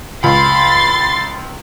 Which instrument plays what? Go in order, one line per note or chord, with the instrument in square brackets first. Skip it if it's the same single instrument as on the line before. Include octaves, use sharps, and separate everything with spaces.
[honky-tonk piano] C#2 [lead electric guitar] B5 [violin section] C6 A6